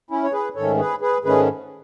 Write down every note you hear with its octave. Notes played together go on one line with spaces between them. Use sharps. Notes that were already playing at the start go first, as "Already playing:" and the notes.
C#4 E4
C#5
G#4 B4
G#2 D#3 A3 C#4 A4 C#5
G#4 B4
G#4 B4
G#2 D#3 A3 C#4 G#4 B4